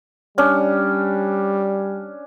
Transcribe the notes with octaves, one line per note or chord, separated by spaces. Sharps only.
G3 C#4 D4